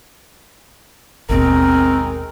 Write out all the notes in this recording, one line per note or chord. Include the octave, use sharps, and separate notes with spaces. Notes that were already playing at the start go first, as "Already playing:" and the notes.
G#1 D#2 B2 D#3 G#3 C4 A#4